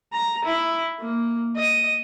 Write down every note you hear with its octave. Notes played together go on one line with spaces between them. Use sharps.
A#5
E4
A#3
D#5